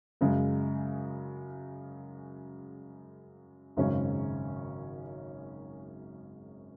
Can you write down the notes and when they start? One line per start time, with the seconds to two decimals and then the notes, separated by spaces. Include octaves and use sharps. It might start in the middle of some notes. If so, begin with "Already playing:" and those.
0.21 F#2 C#3 G#3
3.77 G#1 F#2 C#3 G#3 C#4